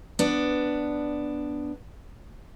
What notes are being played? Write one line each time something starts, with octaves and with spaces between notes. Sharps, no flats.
B3 D4